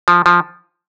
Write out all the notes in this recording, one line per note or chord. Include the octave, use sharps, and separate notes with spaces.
F3
F3